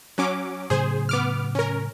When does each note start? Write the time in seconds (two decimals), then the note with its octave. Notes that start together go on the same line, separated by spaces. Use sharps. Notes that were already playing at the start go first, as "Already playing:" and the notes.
0.18 F#3 C#4 D6
0.70 A2 C#3 F#3 G#4 C5
1.09 B3 D6 F6
1.55 C#4 A#4